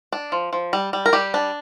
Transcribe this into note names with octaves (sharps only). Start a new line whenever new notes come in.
D4
F3
F3
G3
G3
A#4
G3 G4
D4